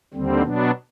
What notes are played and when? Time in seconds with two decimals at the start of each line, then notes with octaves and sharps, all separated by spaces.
0.14 D#2 D3 G3 C4
0.43 B2 F#3 B3 D4